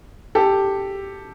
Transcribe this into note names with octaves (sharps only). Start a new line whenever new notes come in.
G4 A4